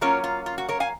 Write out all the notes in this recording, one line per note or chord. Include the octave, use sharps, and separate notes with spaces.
F#3 A#3 C#4 F4 A#4 C#5
F4
F4
F#4
A#4 C#5
F5 G#5